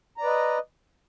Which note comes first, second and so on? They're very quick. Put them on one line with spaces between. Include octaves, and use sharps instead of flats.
A#5 D5 B4 D#5